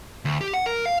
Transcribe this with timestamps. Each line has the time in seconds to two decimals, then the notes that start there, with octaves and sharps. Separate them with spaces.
0.25 D2
0.41 G4
0.54 F#5
0.66 A#4
0.85 F5